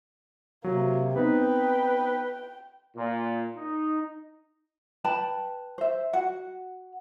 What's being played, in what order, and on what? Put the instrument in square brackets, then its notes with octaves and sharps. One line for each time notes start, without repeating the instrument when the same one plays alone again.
[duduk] C3 [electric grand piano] F#3 [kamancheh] A#3
[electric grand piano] B3 C4 D#4 [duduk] B4 [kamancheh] G5
[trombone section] A#2
D#4
[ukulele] B4 G5 A5 B5
C5 E5
F#4 F#5